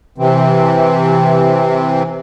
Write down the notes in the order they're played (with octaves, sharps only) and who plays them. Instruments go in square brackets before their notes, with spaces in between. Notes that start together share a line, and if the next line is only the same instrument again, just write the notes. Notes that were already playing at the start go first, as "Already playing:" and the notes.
[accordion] C3 E3 C4